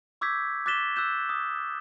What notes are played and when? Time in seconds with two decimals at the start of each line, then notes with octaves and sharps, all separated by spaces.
0.21 C#6 D6 E6 G6 G#6 B6
0.66 D6 F#6 A6 B6 E7 G7
0.96 E6 F#6 G6 E7
1.29 D#6